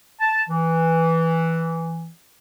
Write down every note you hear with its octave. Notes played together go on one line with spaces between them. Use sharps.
A5
E3